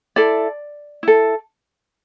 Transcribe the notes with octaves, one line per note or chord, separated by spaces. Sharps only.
E4 A4 D5
E4 A4